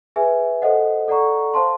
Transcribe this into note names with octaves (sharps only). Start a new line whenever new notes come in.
G#4 B4 E5 G#5
A4 C5 D#5 F#5
A4 D5 F#5 A#5 C#6
C5 F5 A5 C6